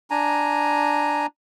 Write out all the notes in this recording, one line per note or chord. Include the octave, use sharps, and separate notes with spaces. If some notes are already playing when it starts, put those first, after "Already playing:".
D4 G#5 A#5